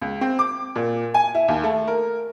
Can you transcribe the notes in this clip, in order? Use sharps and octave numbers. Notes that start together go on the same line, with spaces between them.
C#2
C4
D6
A#2
G#5
E4
D#2
A3
A#4